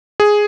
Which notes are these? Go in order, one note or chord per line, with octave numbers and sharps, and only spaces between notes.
G#4